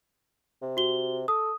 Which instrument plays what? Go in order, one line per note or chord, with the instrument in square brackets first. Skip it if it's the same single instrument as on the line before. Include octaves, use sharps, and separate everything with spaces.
[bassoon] C3
[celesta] F#4 G7
[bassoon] A4 [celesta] D#6